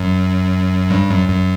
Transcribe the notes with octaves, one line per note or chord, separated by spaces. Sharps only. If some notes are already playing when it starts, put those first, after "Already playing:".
Already playing: F#2
G2
F#2
F#2